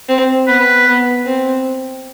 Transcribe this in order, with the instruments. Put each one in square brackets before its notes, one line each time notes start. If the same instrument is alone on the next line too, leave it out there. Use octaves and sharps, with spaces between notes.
[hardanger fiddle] C4
[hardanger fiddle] B3 [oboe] B4
[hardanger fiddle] B3
C4